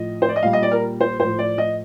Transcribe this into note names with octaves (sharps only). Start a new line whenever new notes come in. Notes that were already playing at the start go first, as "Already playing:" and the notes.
Already playing: A2 F3 D#5
C5
D5
D#5
A#2 G3 F5
D#5
D5
A#4
C5
A2 F3 C5
D5
D#5